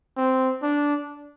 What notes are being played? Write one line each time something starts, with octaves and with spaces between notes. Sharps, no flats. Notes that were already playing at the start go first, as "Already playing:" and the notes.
C4
D4